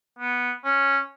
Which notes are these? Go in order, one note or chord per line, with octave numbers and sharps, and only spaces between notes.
B3
C#4